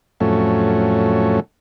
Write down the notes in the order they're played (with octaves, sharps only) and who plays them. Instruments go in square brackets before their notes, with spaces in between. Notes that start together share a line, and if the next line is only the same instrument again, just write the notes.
[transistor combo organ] F2 A2 F#3 A3 C#4